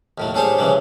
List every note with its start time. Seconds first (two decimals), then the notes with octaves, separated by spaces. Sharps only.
0.18 D#2 A2 F#3
0.34 G3 D4 G#4 C5 C#5
0.58 C#3 E3 F#3 G3